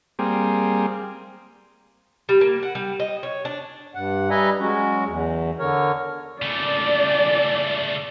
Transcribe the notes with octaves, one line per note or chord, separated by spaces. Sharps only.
G3 A#3 C4 G#4
G3
A#3
F#5
G3
D#5
C#5
D4
G2 F#5
G3 B4 D#5 E5 G#5 A#5
F#3 G#3 C#4 F#4
E2
D3 A#4 C#5
C#3 A3 D5